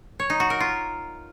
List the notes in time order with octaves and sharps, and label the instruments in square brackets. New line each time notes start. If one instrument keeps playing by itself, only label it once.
[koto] C#5
D#4
F#4
A#4
F4